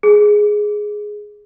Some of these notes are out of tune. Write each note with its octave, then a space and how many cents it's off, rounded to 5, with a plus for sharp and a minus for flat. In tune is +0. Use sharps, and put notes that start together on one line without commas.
G#4 +5